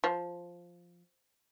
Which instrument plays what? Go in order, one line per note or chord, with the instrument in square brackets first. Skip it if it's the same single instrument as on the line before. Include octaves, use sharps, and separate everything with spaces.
[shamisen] F3